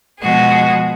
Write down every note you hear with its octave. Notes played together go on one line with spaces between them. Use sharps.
B2 F3 G#3 F#4 G#4